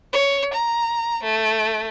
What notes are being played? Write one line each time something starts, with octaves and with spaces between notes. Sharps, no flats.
C#5
A#5
A3